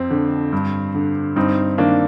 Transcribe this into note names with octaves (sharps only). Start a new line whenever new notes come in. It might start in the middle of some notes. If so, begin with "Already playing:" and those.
Already playing: F2 C4
D3
G2
D3
G2 C4 D#4
D#3 A#3 D4